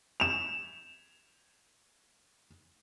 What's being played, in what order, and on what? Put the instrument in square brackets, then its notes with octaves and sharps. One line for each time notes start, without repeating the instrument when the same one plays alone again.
[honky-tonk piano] E7 F7